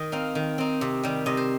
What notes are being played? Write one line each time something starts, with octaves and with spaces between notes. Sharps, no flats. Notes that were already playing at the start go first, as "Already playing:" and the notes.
Already playing: D#3 D#5
C4 D#4 F5
D#3
C4 D#4
C3
D#3 G3
C3 D#5
C5